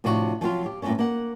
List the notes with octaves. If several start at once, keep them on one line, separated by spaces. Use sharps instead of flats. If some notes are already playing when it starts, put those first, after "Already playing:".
A2 C3 F3 D4 F4 F#4
F3 F#3 C4 F4
G4
G2 A#2 C#3 A3 C#4
A#3 F#5